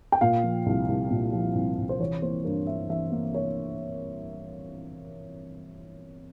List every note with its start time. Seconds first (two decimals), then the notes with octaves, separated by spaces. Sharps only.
0.12 G5
0.21 A#2 F5
0.44 F3
0.66 C2
0.88 C2
1.10 A#2
1.33 F3
1.55 C2
1.78 C2
1.89 C5
2.00 E3 C#5
2.22 A#3 C5
2.44 G2 A#4
2.67 G2 E5
2.89 E3 E5
3.12 A#3
3.34 C#5